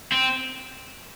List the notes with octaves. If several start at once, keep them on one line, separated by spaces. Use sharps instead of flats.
C4